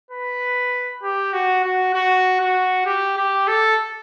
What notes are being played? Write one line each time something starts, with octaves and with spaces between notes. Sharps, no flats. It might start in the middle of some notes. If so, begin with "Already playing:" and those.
B4
G4
F#4
F#4
F#4
F#4
G4
G4
A4